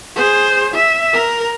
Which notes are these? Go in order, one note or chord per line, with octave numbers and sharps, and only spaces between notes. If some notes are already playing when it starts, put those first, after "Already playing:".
G#4 C5
E5
A#4